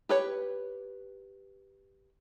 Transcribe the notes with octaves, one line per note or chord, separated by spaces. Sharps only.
G4 B4 C#5